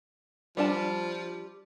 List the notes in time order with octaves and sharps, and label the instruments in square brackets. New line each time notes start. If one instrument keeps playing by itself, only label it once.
[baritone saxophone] F3 [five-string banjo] G3 D4 A5